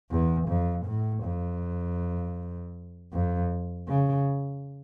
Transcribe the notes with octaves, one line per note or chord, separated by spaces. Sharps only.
E2
F2
A2
F2
F2
C#3